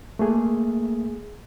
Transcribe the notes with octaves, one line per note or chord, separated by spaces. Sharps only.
A3 A#3 G#4